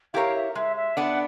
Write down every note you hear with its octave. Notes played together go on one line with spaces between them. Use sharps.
E4 G4 A#4 C#5 F5
E5
G#3 E5
E5
B3 D4 F#5